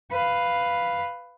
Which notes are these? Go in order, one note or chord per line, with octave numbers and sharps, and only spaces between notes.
B4 F5